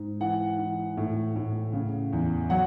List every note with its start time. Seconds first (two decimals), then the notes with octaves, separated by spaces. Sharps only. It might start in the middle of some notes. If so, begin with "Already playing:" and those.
Already playing: G#2
0.20 E3 F#5
0.59 E3
0.97 A2
1.36 A2
1.73 C#3
2.13 E2
2.50 F#3 F#5